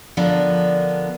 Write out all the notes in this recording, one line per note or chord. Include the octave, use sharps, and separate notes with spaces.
D3 F3 B3 D4 A#4